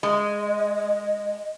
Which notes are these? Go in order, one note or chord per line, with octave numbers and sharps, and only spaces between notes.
G#3 D#5